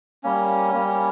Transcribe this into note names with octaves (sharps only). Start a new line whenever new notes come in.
G3 A#3 C#4
G3 A#3 C#4